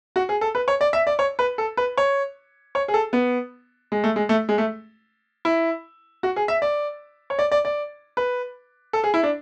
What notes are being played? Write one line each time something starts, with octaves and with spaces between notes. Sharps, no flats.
F#4
G#4
A4
B4
C#5
D5
E5
D5
C#5
B4
A4
B4
C#5
C#5
G#4
A4
B3
G#3
A3
G#3
A3
G#3
A3
E4
F#4
G#4
E5
D5
C#5
D5
D5
D5
B4
A4
G#4
E4
D4